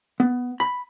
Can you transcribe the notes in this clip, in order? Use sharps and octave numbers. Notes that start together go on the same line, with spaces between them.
B3
B5